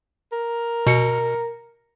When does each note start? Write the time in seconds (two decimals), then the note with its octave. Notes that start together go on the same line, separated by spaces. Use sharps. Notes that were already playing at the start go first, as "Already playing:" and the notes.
0.33 A#4
0.87 B2 C#7